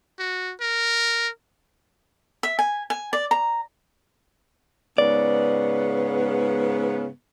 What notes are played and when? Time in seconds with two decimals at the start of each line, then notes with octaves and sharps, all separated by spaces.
0.19 F#4
0.61 A#4
2.43 E5
2.59 G#5
2.90 G#5
3.13 D5
3.31 A#5
4.98 G#2 C#3 B3 D5